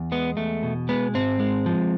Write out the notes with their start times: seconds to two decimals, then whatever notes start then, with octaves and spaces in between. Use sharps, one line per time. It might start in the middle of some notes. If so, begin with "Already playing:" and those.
Already playing: E2
0.12 G#3 B3
0.37 E2 A3
0.63 B2
0.89 G#3 B3
1.14 G#2 C4
1.40 G#3
1.66 F3